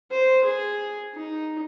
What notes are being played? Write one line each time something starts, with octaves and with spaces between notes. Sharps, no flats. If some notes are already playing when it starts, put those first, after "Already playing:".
C5
G#4
D#4